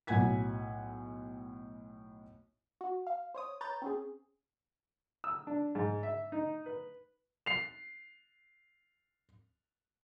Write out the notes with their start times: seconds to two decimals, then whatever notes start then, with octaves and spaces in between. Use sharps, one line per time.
0.07 B1 A2 F#5 G#5 G#6 B6
2.81 F#4
3.07 F5
3.35 C5 C#5 D#6
3.61 B4 C#5 A#5 G6 A6
3.82 C4 C#4 G#4
5.24 E6
5.47 D4
5.75 G#2
6.03 E5
6.32 D#4
6.66 B4
7.46 C7 F7